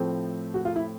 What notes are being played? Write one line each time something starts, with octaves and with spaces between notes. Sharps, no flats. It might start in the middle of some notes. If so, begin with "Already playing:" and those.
Already playing: A2 F3 A3 C4
F#4
F4
E4